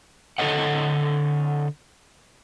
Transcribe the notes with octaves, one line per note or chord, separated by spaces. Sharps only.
D3 A4 C#5 D#5 F#5